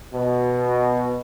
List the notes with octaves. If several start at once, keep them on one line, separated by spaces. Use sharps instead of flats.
B2